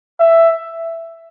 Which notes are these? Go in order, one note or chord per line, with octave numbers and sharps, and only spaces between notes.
E5